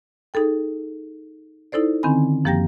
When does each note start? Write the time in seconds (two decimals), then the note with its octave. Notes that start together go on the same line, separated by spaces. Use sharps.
0.34 D#4 G#4 A4 G5
1.72 D#4 E4 A4 C5 D5
2.03 D3 D#3 C4 C#4 G#5 B5
2.45 F#2 F3 A#3 G4 G5 A#6